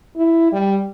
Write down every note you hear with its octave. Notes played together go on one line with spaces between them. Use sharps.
E4
G3